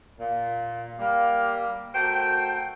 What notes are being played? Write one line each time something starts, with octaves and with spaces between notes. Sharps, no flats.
A#2
G3 A#3
A3 F#4 A#4 C5 G5